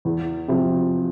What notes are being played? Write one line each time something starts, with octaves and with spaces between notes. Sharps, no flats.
E2
C3 F3